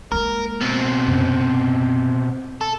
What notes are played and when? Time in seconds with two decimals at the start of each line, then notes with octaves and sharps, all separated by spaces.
0.12 G#3 A#3 A#4
0.61 B2 C4
1.08 F#2 C3
2.61 A4